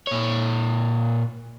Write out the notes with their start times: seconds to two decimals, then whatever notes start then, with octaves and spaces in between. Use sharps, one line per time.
0.07 A#2 C#5